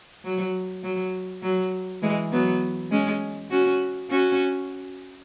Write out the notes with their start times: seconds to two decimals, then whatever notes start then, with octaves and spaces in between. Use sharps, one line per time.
0.25 F#3
0.84 F#3
1.43 F#3
2.02 E3 G#3
2.32 F#3 B3
2.91 G#3 C#4
3.51 C#4 F#4
4.10 C#4 F#4